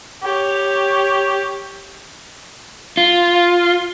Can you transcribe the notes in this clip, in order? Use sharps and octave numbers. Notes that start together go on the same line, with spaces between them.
G4 C#5
F4